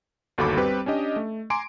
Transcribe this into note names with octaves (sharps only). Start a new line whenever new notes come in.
G1 D#2 F#4 A4 B5 D6
G3 C4 G4 B4
C#4 D4 G4 D#5
A3
G#5 A#5 C6 D6 D7